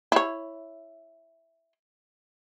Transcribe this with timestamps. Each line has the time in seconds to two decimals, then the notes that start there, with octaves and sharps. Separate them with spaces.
0.12 E4 C#5